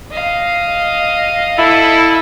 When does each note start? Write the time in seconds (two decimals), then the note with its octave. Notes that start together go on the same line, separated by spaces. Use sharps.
0.11 D#5 F5
1.58 E4 A4